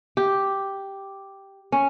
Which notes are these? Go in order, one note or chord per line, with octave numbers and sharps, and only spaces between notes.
G4
C#4